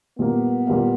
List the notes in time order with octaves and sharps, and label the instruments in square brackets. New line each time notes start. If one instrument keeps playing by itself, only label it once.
[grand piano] A#2 G3 A#3 [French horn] B3
[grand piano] A#2 G3 A#3